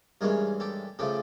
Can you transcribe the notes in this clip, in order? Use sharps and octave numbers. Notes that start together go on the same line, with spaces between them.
G2 E3 G#3 C#4 G#4 A#4
G4 A4
C#3 F3 A3 G4 A4